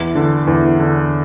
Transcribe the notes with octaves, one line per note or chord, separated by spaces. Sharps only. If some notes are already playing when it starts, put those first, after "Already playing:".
Already playing: E2
D3
E2
D3